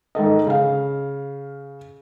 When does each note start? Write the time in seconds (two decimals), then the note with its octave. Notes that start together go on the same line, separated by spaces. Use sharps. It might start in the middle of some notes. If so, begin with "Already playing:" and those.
0.15 G#2 D#3 A4 D#5
0.47 C#3 F5